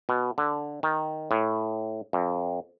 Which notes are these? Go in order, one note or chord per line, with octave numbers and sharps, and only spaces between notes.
B2
D3
D#3
A2
F2